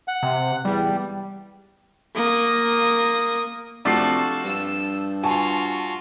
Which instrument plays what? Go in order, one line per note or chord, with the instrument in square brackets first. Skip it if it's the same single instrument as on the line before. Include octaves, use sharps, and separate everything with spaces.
[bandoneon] F#5
[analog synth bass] C3
[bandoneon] E2 [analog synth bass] G3
[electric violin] A#3 D#6
[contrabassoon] C3 [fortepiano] F3 A3 D4 [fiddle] F#4 A4 [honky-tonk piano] D6 C7
[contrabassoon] G2 [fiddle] E6
[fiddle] F4 F#4 [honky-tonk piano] G#5 A5 C#6